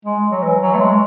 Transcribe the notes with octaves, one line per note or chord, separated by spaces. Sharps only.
G#3
F#3
E3
F#3
A3
G#3